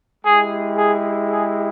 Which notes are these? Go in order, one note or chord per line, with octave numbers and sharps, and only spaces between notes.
G#3 E4 G4 G#4
G#4
G#4